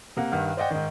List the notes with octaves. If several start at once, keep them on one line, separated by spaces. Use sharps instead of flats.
C3 A#3 F#5
G2 D#3 F#5 F6
C5 D5 D#5 F#5 G5
G#2 D#3